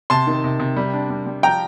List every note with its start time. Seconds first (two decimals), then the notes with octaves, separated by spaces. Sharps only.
0.10 C3 A5 C6
0.27 D#3
0.44 C3
0.60 C3
0.76 G3
0.94 D4
1.10 G3
1.26 G3
1.43 F3 G5 A#5